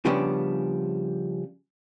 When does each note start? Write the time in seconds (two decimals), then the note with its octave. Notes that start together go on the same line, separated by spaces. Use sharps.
0.05 C#3 F3 G3 B3 C#4 D4